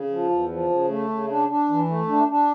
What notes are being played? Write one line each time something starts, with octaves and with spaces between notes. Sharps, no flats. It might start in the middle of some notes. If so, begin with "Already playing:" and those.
Already playing: C#3
F3
E2
F3
C#3
A3
C#3
D4
D4
E3
A3
D4
D4